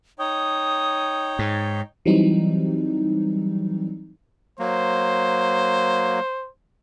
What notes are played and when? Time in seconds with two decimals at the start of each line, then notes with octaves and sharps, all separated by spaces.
0.19 D#4 C#5 G5 D#6
1.39 G#2
2.06 E3 F#3 G3 C4 D#4
4.59 F#3 A#3 C5